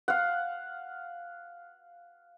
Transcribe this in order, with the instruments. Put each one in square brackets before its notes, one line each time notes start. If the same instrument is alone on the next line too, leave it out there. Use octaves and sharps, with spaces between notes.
[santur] F5 F#5